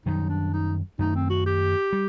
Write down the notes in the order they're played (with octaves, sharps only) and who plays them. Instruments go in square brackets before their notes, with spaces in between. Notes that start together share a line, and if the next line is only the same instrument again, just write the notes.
[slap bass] F#2 D#3 G3 [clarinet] D#4
[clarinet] D4
D#4
[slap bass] F#2 D#3 A3 [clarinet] D#4
[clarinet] C4
F#4
G4
[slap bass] G3